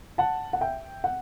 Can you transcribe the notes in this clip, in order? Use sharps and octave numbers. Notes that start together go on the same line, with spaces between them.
F#5 A5
F#5
E5 G5
F#5